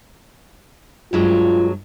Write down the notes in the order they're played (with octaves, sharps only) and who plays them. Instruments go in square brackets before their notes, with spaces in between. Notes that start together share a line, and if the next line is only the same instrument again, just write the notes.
[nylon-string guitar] G2 F#3 G#3 [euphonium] F4